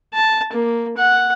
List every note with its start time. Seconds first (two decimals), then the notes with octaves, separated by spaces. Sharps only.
0.13 A5
0.53 A#3
0.97 F#5